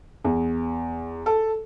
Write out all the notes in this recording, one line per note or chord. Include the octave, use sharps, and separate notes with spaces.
E2
A4